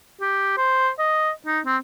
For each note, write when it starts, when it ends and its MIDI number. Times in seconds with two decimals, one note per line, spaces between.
0.21 0.56 67
0.58 0.90 72
0.99 1.31 75
1.46 1.60 63
1.66 1.77 60